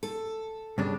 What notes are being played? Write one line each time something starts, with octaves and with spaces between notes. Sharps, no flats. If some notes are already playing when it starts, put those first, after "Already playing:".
A4
G2 C#3 D4